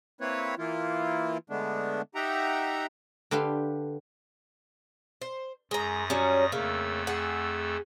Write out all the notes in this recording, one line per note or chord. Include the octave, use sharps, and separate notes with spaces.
A#3 C4 E4 B4 C#5
E3 A#3 E4 F4
D3 G#3 A3 B3 D4
D#4 G4 E5 F#5 G5 A#5
D3 D4 G4 B4 F5 C6
C5
F#2 G#3 A#5 D#6 A#6
F#3 G3 C#4
F2 C#3 A3 A#3 E6
G#4 F#5